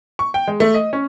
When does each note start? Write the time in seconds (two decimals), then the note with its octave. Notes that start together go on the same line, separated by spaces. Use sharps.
0.19 C#6
0.34 G5
0.48 G#3
0.60 A3
0.74 D#5
0.93 C#4